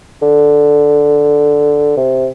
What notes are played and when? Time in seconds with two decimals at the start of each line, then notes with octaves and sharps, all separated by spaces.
0.22 D3
1.97 C3